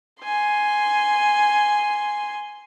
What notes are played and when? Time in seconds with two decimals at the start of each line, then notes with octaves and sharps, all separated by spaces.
0.22 G#5 C6